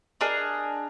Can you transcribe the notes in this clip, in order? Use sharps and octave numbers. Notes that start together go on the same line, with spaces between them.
D4 G#4 A#4 D#5